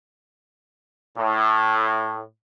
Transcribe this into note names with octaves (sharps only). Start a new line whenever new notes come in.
A2